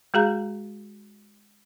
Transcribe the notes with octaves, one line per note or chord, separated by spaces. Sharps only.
G#3 F#4 G#4 F5 A#5 G6